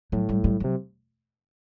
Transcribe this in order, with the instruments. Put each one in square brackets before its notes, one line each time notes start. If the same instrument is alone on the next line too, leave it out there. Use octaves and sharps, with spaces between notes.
[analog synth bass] A2 [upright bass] F#3
[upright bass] G3
G3
F#3
[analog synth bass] C3